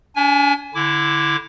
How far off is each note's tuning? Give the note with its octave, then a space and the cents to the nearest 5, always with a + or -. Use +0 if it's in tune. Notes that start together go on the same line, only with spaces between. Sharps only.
D4 -45 G#5 +0
D3 +0 E4 +0 D6 +0